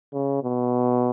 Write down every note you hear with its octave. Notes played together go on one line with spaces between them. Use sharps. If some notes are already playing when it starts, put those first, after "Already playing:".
C#3
B2